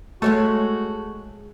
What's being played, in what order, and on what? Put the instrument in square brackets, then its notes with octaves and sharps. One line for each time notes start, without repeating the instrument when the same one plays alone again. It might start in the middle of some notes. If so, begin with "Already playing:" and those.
[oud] G#3 C#5 E5 [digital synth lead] A3 [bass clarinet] F#4